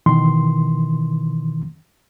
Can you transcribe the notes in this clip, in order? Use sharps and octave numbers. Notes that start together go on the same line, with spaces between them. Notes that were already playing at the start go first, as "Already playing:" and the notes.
B2 D#3 E3 C6